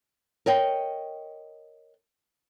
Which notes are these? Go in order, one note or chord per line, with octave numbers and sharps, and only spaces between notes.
A#4 C#5 D#5 G5